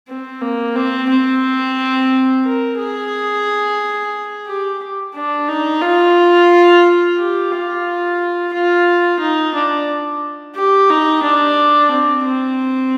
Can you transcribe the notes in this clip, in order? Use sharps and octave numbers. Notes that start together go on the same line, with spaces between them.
C4
A#3
C4
C4
A#4
G#4
G4
D4
D#4
F4
G4
F4
F4
D#4
D4
G4
D#4
D4
C4
C4